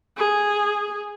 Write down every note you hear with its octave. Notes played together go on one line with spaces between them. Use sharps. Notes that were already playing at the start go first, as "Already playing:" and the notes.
G#4